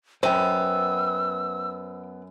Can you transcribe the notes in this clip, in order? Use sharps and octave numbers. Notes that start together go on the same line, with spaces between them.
F#2 B3 C5 G5 E6